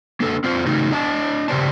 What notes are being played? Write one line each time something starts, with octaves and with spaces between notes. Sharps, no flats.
A#3 D4 A4
C4 D4 F4 C5
C#3 A3 D#4 F#4
D4 D#5 A5
C#3 G4 C5 D5 A5